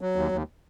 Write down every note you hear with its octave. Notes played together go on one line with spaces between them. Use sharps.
F#3
D#2
D#2